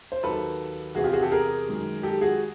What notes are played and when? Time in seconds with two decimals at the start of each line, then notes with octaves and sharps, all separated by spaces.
0.12 C5
0.23 D#2 D#3 F#3 A4 B4
0.95 E2 C3 E3 F#4 G#4
1.04 F4 G4
1.13 F#4 G#4
1.22 G4 A4
1.31 G#4 A#4
1.68 F#2 D#3 G#3
2.03 G4 A4
2.21 F#4 G#4